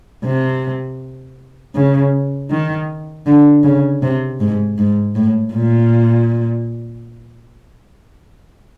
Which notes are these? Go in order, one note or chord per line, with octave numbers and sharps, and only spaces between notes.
C3
C#3
D#3
D3
C#3
C3
G#2
G#2
A2
A#2